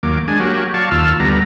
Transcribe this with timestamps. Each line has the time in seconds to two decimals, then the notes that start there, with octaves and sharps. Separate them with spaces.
0.03 D#2 F#3 A#3 D6
0.28 G#3 D4 G#5
0.40 F#3 A#3 F#4 G4 C#5
0.74 F#3 D5 F5 A5 C#6
0.91 D#2 F4 A5 E6 F6
1.20 D2 G3 B3 A#5